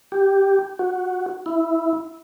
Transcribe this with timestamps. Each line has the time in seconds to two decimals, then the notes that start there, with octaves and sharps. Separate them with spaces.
0.12 G4
0.79 F#4
1.46 E4